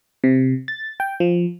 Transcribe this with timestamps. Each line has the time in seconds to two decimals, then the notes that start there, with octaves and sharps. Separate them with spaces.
0.24 C3
0.68 A6
1.00 G5
1.20 F3